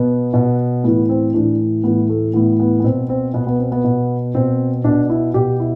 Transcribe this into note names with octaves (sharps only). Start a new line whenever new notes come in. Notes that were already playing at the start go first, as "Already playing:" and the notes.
Already playing: B2 B3
B2
A2 E3 B3
C4
A2 E3 D4
A2 E3 B3
A3
A2 E3 B3
B3
B3
B2 C4
C4
B2 B3
B3
C4
B3
B2
B2 C4
B2 D4
E4
B2 G4
E4